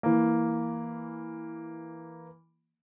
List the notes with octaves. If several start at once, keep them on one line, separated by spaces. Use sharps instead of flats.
E3 A#3